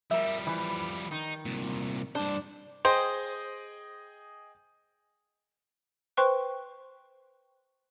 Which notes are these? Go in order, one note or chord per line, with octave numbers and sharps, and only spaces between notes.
F3 G3 A#4 E5
E3
D#3 D#4
C2 A#2
G2 D4 C5
G#4 C5 D#5 G5
B4 C5 G5 C6 C#6 F#6